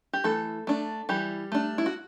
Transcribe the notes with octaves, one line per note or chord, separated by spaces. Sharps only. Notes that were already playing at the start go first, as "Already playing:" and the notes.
G4
E3 A3 A4
A3 D4
E3 G3 G4
A3 D4
E4
F#4